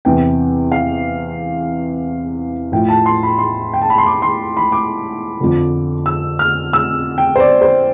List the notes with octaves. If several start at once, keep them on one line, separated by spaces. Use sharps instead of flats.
E2 C3 E3 G5
F5
A2 F3 G5
A5
C6
B5
C6
G5
A5
B5
C6
D6
C6
B5
D6
F2 D3 F3
E6
F6
E6
G5
C5
D5
C5